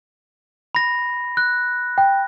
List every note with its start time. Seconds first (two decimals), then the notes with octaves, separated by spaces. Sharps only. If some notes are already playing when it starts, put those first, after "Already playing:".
0.75 B5 A#6
1.37 F#6
1.98 G5